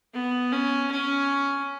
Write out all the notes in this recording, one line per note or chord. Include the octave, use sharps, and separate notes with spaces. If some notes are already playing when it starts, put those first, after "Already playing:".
B3
C#4
C#4